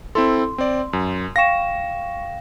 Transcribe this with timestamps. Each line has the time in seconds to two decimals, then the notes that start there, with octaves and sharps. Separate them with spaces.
0.15 C4 E4 A4 C6
0.58 C4 D5
0.93 F#2
1.36 F5 G5 C#6 A#6 E7